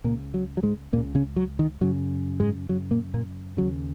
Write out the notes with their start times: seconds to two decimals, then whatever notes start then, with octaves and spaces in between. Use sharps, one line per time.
0.04 C#2 A#2 C#3 A#3
0.34 F#3
0.57 F#3
0.63 G#2 G#3
0.93 C#2 A#2 A#3
0.96 C#3
1.15 C#3 C#4
1.36 F#3
1.59 D#3
1.81 F#2 C#3 F#3
2.40 G#2 G#3
2.69 F#2 C#3 F#3
2.91 A#2 A#3
3.14 A#2 A#3
3.57 D#2 C#3 F#3